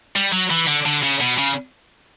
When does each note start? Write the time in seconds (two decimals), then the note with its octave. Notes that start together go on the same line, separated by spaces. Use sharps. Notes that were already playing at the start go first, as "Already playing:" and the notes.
0.16 G3
0.32 F#3
0.51 E3
0.67 D3
0.86 D3
1.03 C#3
1.20 B2
1.38 C#3